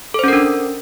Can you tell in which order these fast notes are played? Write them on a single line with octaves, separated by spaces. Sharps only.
A4 C5 C#4 A#4 D4